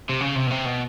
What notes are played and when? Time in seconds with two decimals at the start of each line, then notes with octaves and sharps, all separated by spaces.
0.09 C3
0.21 C#3
0.36 C3
0.47 B2
0.50 C3
0.66 B2